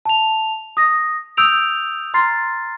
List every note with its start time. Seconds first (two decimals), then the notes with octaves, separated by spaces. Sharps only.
0.05 A5 F7
0.77 D#6 A#6
1.37 D#6 E6 G6 D7 F7
2.14 A#5 C6 F6 A6 C7